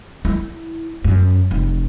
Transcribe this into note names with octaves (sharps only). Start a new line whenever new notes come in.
E4
F#2
F1